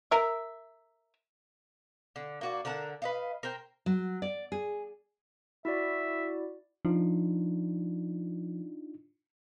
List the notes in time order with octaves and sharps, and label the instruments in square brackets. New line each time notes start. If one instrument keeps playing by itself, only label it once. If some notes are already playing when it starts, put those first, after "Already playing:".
[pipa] A#4 E5
[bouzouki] D3
A#3 F#4 D5
D3 A#4 F#5 A5
B4 D#5 F5
A#4 C5 G5
[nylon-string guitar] F#3
D5
G#4
[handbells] E4 F#4 D5 [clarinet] E5
[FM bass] F3 [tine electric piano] D4 D#4 F4